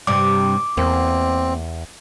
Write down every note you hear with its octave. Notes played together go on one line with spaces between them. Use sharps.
G2 C3 D6
E2 A#3 C4